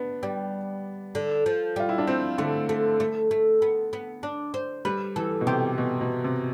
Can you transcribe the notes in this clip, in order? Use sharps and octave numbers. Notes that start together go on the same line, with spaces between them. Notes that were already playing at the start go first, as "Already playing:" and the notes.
Already playing: B3 D4
G3
D3
F3
G3 F4
E4
D4
F3 C4
D3 A3
A3
A3
A3
B3
B3
D4
C5
G3 B4
E3 A4
B2
C3 G4
B2
B2
C3